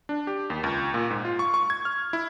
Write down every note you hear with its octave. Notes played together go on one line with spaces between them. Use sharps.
D4
G4
D#2
C#2
A#2
G#2
F4
C#6
C#6
G#6
F6
E4